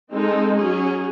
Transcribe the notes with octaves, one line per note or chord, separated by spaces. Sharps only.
G#3 C4 D#4 A4
F#3 C#4 G#4